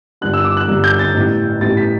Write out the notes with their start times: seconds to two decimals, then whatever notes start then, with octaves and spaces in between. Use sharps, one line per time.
0.21 G1 G2 D3 G3 F#6
0.34 E6
0.45 D6
0.57 F#6
0.68 G1 G2 D3 G3
0.84 G6
0.99 A6
1.14 A1 A2 G3 B3
1.61 A1 A2 G3 B3 A6
1.77 B6